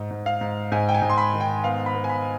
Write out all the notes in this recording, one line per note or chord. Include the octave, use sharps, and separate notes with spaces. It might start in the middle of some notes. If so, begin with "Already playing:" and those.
Already playing: G#2
G#2
F5
G#2
G#2 G#5
G5
G#5
G#2
C6
B5
D#3
G5
B3 F5
B5
B3
G#5
B5